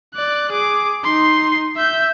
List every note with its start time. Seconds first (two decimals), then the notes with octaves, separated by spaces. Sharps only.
0.15 D5 F#6
0.51 G#4 D6
1.04 D#4 C6
1.76 E5 G6